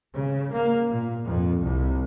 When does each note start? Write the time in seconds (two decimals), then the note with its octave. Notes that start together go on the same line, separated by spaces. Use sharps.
0.14 C#3
0.51 A#3
0.89 A#2
1.25 F2
1.61 C2